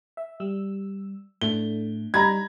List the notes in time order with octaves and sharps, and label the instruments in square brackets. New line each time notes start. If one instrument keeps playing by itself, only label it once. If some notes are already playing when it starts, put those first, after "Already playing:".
[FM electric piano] E5
G3 E6
[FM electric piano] A2 A3 D4 [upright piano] G7
[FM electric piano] G3 D#4 A#6 [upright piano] A#5 B5 G#6